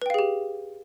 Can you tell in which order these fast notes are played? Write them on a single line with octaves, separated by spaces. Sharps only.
B4 G5 F5 G#4 G4